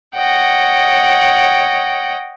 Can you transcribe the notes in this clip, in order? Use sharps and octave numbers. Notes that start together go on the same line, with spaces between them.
C#5 D#5 F#5 G5